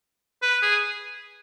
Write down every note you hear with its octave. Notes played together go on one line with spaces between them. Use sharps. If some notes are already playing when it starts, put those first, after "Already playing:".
B4
G#4